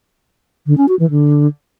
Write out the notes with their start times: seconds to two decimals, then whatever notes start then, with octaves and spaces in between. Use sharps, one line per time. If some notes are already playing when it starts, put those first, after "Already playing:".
0.66 D3
0.77 C#4
0.88 F#4
0.99 E3
1.10 D3